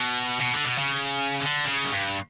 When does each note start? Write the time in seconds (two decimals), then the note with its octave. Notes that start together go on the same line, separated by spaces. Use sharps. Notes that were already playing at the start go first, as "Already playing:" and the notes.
Already playing: B2
0.40 B2
0.53 D3
0.65 B2
0.78 C#3
1.40 D3
1.65 C#3
1.84 F#2
1.91 G2